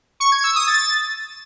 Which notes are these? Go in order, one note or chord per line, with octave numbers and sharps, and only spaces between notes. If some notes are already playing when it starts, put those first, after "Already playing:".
C#6
G#6
E6
D#6
A6